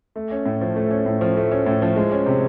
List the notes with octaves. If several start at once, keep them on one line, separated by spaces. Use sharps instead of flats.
A3
C#4
A2
F3
A3
C#4
A2
F3
A3
C#4
A2
F3
G#3
C#4
C3